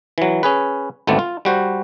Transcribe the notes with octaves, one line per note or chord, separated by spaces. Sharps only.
E3 F#3
C#4 G#4 B4
G#1 D2 A3 B3 C4 D5
F4
G3 F#4 C5